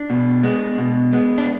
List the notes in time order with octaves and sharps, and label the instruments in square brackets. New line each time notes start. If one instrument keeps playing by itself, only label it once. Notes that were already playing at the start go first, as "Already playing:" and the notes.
Already playing: [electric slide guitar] D4
B2
G#3 B3
B2
G#3 B3
D4